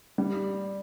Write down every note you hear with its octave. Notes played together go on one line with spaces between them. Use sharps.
G3